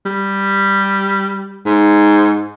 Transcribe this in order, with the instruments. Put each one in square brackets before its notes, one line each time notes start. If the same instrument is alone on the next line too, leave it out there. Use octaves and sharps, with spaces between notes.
[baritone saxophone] G3
G#2